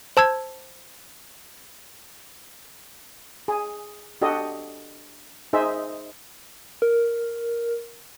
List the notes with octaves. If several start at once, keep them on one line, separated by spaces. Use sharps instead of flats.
C5 A5 E6 G#6
G#4
D4 F#4 G4 A4 D#5
D#4 G#4 C5 E5
A#4